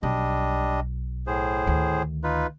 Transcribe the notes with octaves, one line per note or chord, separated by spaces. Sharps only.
B1 G3 D4 D#5
A2 G#4 C5
D2 D#3
D#4 F4 B4